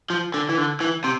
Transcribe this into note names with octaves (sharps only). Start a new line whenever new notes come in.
F3
D3
E3
D3
E3
C3